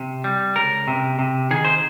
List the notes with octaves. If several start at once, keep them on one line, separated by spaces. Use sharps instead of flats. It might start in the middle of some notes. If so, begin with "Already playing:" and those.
Already playing: C3
G3
C#2 A#4
C3
C3
D#3 G#4
C5